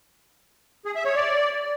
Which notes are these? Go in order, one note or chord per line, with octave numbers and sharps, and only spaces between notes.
G#4
E5
C#5
D5